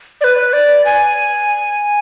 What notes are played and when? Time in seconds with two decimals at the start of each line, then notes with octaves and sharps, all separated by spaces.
0.21 D5
0.24 B4
0.53 D5
0.85 G#5